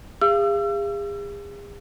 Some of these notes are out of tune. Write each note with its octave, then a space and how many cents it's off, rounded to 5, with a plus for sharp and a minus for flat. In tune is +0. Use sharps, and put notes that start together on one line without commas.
G#4 -40 F5 -30 E6 +35